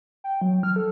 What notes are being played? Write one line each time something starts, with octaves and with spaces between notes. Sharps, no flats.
G5
F#3
F6
A4